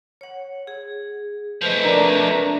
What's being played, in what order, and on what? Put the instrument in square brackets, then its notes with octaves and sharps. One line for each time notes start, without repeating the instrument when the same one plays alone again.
[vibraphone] C#5 F#5
G#4
[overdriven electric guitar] F3 A3 [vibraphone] B4 C5 D#5
[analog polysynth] D4 A#5 [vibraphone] A#4 B4